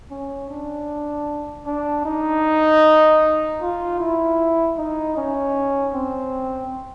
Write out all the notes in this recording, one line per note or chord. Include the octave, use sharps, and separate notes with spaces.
C#4
D4
D4
D#4
F4
E4
D#4
C#4
C4